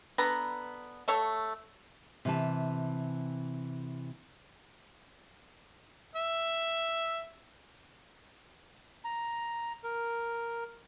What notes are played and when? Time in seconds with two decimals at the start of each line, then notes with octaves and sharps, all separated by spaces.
0.18 D3 B3 A#5
1.08 A3 A4 C#5
2.25 C3 E3 A5
6.16 E5
9.05 A#5
9.84 A#4